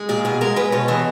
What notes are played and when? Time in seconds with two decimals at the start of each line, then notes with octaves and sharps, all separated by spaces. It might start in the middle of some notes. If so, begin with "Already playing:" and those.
Already playing: G#3
0.09 A#2 G#4
0.25 B2 G#4
0.41 G#3 A#4
0.56 G#3 B4
0.72 B2 C#5
0.88 E3 D#5